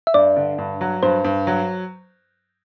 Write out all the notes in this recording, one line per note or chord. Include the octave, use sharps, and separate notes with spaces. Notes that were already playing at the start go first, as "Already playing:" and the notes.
E5
G2 D5
D3
G2
F#3
G2 C5
G2
F#3